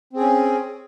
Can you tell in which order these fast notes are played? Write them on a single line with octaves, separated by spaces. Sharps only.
C4 G#4 C#4